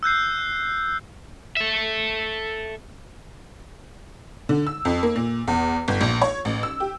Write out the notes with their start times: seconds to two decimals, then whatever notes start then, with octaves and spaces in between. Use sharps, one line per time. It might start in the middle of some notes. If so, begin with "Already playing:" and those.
0.03 E6 F#6 G6 C7
1.57 A4 E5
4.49 D3
4.67 E6
4.85 F2
5.03 A#3
5.16 A#2
5.47 E2
5.88 G1
6.01 A#1
6.22 C#5
6.45 A1
6.63 E6
6.80 G4